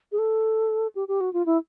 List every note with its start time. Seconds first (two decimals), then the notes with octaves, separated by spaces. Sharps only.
0.12 G#4
0.18 A4
0.95 G4
1.08 G4
1.21 F#4
1.33 F4
1.46 E4